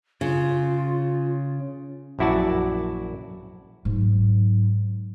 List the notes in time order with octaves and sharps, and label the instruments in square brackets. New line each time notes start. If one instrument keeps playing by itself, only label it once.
[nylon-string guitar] C#3 [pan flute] F4
[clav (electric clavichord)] A#1 F#2 E4 F#4 D5 A5
[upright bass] G#2 F#3